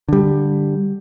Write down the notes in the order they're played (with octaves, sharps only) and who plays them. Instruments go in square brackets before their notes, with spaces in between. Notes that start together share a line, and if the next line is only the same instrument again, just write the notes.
[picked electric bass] D3 G3